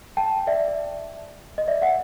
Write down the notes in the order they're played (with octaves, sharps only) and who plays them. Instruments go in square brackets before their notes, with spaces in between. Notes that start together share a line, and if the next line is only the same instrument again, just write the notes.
[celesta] G5 A5
D5 E5
D#5
D5 E5
E5 F#5